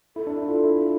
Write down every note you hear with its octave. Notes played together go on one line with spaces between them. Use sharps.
E4 A4
D4
E4
F4
E4
A4